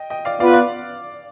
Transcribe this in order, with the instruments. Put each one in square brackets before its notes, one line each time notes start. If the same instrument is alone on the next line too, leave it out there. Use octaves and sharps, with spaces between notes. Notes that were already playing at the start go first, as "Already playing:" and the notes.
Already playing: [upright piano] D#5 G5
D#5 G5
D5 F5
[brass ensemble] B3 F4 B4 [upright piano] D5 F5
[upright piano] D5